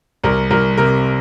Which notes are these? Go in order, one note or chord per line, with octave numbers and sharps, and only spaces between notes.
C2 A#4
C2 A#4
C3 A#4